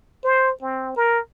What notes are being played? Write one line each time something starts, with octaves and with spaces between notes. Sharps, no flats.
C5
C4
A#4